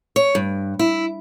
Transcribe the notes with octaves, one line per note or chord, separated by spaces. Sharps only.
C#5
G2
E4